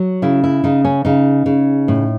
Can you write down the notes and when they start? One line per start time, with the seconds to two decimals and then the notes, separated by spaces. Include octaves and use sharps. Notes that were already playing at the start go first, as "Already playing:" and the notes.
Already playing: F#3
0.22 C#3 E4
0.44 E4
0.64 C#3 D#4
0.85 C#4
1.05 C#3 D#4
1.46 C#3
1.88 A2